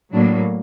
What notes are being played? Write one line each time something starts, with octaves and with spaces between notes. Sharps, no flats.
A2 F#3 A#3 D4